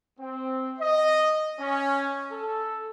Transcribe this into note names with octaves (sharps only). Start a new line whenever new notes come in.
C4
D#5
C#4
A4